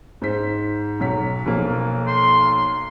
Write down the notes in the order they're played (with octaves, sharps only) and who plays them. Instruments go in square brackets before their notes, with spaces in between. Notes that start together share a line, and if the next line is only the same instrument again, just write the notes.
[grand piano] G#2 C5 B6
B1 F#3 B6
B1 F3 A#3
[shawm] C6